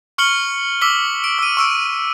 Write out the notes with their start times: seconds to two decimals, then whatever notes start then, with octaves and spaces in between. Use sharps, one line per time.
0.18 C#6 F6 C#7 F#7 G7
0.81 D6 E6 B6 G7
1.24 D7
1.39 E6 D#7
1.57 C#6 E6 D7